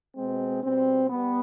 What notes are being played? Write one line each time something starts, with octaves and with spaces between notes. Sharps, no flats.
B2 G#3 C4
B2 G3 C4
G3 B3